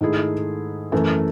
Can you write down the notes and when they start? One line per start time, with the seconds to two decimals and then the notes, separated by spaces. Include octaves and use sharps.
0.01 G#2 D#3 A3 E4 G#4
0.92 F#2 E3 A3